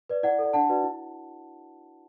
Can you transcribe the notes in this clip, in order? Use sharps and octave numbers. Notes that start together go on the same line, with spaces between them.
B4 D5
E4 D5 F#5
A4 D5
D4 F#5 A5
F#4 B4 D5
E4